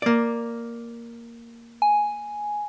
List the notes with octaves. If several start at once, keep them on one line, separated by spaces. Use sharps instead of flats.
A#3 D5
G#5